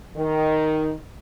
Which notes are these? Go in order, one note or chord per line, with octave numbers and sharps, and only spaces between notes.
D#3